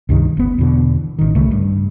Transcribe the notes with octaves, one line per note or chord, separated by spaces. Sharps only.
C#2 G2 C3 D#3
F#1 B3
E2 B2 D3
A1 D#3
C2 C#3 A3
G2